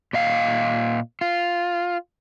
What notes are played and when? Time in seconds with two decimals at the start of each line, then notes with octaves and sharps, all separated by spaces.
0.13 A#2 D#5 F5
1.21 F4